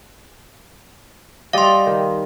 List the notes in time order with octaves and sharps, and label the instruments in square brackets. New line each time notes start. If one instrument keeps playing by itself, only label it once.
[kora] G3 D5 D#5 [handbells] F5 C6
[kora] D#3